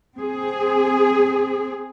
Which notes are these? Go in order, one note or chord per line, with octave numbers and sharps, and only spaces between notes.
C4 G#4